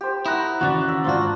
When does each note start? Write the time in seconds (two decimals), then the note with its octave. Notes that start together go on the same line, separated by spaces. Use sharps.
0.01 G4 C5
0.26 E4 F#5 A#5 D#6
0.61 D#2 C#3 E3 F#4 D5
0.89 E5
1.05 D#2 G#2 D4 F4 F#4 C5